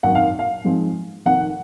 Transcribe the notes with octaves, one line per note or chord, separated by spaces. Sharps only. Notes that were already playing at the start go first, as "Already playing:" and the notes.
G#1 F#2 D#3 F#5
F5
F5
G#2 F3 G#3 C4
F1 F2 D#3 F#5